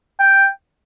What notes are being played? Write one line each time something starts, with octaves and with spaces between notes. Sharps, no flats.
G5